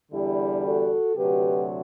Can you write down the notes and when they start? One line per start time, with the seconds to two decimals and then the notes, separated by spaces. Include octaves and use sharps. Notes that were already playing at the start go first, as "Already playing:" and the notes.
0.11 E2 D3 G3 E4 G4
0.63 F#4 A4
1.15 D2 C3 F#3 G4 B4